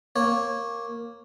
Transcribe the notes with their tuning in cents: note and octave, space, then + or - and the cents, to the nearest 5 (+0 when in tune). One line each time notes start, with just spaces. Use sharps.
A#3 +0 C#5 -15